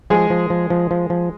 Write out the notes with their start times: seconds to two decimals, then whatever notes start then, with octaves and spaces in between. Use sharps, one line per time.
0.10 F3 G#3 G#4
0.30 F3
0.50 F3
0.70 F3
0.91 F3
1.10 F3